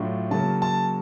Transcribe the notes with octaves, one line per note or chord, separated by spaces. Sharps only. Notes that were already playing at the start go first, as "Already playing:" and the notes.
Already playing: A2 F#3 A3 D4 F4
C#3 F#3 A#3 A5
A5